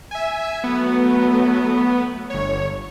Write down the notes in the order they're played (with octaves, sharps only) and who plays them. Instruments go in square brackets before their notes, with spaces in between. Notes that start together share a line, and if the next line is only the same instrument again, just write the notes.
[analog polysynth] E5 G#5
[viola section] F#3 A3 [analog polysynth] B3
[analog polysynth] G1 C#5